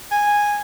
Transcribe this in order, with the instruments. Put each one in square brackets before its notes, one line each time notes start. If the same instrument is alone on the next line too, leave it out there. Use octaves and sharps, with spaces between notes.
[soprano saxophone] G#5